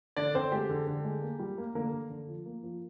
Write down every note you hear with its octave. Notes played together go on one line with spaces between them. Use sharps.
D3 D4 D5
D3 C4 C5
G#3 G4
D3
D3
G#3
A#3
G3
A#3
D3 A#3 A#4
D3
D3
F3
A#3
F3